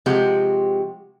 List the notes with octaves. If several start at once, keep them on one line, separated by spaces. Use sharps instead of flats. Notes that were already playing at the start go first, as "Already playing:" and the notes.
C3 F3 G#3 F#4 G4